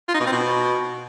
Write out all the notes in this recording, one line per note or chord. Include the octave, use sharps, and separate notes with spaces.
F4
D#4
B2
C4
B2